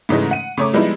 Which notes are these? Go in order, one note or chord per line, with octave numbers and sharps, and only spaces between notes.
G#2 C#3 E3 G#3 A3
F#5 D#7
C#3 A3 C#5 A#5 D6
F3 G3 G#3 B3 D#4 E4